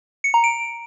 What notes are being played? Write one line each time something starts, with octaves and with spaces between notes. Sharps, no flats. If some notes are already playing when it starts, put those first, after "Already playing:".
C#7
A#5
D7